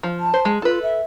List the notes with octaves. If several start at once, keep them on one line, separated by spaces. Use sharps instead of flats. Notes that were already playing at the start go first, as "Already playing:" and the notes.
F3
A5
C5
G#3
F4 A4 B4
E5